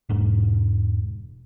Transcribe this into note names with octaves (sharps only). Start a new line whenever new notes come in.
E1 G#2